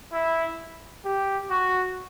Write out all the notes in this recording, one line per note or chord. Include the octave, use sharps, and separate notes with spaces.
E4
G4
F#4